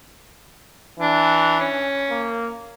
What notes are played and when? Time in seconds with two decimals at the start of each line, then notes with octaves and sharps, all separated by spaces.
1.00 E3 D4
1.60 C#4
2.10 A#3